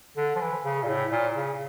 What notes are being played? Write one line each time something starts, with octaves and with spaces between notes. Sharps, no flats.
D3
F3
E3
C#3
A#2
A2
A#2
C#3